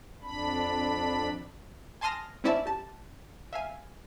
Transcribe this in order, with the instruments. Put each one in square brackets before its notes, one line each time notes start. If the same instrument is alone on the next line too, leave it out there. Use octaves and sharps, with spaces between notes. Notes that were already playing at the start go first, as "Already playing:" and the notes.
[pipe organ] F2 D4 B5
[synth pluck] G#5 A5 C6 D#6 F6 A#6
C4 C#4 E4 D5 E5 A5
G4 A5
E5 F5 G#5